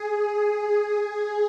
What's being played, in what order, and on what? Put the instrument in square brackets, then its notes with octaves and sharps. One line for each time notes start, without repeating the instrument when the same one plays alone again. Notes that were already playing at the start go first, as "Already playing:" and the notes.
Already playing: [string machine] G#4